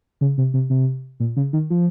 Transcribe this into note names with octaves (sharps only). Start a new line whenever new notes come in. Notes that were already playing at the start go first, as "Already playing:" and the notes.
C#3
C3
C3
C3
A#2
C#3
D#3
F3